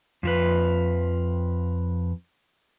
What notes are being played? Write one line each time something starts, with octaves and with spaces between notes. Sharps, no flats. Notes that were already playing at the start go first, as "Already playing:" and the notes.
F2 F3 B4